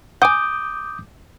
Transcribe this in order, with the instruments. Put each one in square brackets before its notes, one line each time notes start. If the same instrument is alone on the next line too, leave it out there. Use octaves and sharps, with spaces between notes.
[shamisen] F#5 G#5 [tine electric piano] D6 D#6 G6